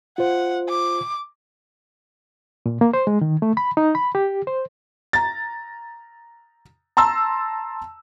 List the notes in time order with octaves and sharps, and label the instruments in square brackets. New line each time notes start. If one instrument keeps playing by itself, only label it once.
[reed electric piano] F4 C5 [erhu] F#5
[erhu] D6
[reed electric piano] A#2
A#3
C5
G#3
D#3
A3
B5
D#4
B5
G4
C5
[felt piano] A#5 A6
A5 A#5 C6 E6